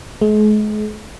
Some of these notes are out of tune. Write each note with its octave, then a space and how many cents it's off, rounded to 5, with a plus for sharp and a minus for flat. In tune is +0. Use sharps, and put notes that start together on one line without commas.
G#3 +40